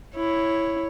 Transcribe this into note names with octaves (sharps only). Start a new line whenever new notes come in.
E4 C#5